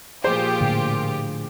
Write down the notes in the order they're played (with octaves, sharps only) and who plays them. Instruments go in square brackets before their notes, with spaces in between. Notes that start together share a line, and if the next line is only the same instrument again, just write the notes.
[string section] A#2 F4 G4 [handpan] F3 G#4 [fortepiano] C5
[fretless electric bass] A2 D3